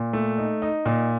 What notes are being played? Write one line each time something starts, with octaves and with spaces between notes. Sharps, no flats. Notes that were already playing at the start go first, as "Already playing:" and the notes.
Already playing: A#2
A3
D#4
D#4
A#2